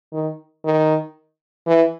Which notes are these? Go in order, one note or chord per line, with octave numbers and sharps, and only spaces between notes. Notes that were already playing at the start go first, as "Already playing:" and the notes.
D#3
D#3
E3